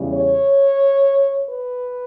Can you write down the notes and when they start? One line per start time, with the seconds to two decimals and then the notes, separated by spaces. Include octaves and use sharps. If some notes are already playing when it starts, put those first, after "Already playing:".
Already playing: E2 C#3 G3
0.13 C#5
1.48 B4